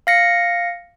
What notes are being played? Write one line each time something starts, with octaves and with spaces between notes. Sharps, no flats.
F5 A#6 C#7